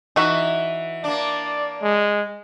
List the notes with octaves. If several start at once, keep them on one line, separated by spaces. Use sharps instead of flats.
E3 D#4 F#4 E5
A#3 D4 D5
G#3